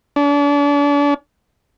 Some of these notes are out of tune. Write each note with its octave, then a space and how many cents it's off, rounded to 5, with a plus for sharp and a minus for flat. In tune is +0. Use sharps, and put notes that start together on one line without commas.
D4 -40